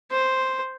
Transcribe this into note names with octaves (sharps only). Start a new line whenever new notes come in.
C5